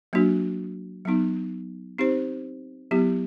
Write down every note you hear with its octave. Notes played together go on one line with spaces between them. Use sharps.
F#3 A#3 D4 F#4
F#3 B3 D#4
C4 D#4 G4 C5
F#3 B3 E4 G4